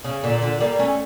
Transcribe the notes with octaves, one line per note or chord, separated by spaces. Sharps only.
C#3
A#2 D3
A#2 D3
G3 A#3
A3 C#4